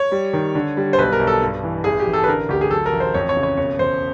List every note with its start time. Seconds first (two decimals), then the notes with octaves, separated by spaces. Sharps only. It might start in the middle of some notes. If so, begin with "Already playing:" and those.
Already playing: C#5
0.12 G3
0.33 D#3
0.55 D3
0.77 G3
0.93 C5
0.98 B1 B4
1.13 A#4
1.19 B1
1.27 A4
1.42 G2
1.64 E3
1.84 A1 G#4
2.00 G4
2.07 A1
2.13 A4
2.24 B4
2.28 D3 A#4
2.49 D2 G4
2.61 G#4
2.71 F#3 A4
2.86 A#4
2.93 A1
3.00 C5
3.14 F2 C#5
3.29 C#5
3.36 C#3
3.43 C#5
3.57 E1 C#5
3.79 E1 C5